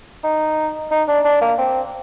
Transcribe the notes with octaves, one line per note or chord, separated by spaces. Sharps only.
D#4
D#4
D4
D4
A#3
C4